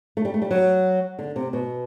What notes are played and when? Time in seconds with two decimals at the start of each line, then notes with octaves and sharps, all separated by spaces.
0.17 A3
0.25 G3
0.34 A3
0.42 G3
0.51 F#3
1.19 D3
1.36 C3
1.53 B2